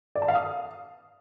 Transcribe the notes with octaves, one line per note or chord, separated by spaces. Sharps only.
D5
A5
F5
D#6